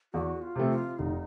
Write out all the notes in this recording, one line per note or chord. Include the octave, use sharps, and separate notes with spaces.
E2 F#4
F4
C3 F3 A3 C4
F4
F1 D#4